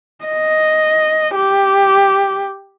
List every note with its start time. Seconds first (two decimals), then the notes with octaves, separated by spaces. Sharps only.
0.25 D#5
1.35 G4